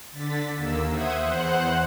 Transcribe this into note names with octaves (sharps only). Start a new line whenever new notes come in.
D3 A6 B6
D#2 A#3 E6
C5 E5 F#5 D#6 G#6
E2 C5 F#5 F#6